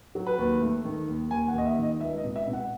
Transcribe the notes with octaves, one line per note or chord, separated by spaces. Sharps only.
F#3
B4
D#2
A3
D#3
D#2
D#2 G#5
F#5
D#2 D#5
E5
D#3 D#5
C#2 E5
D#5
B2
E5
B2
F#5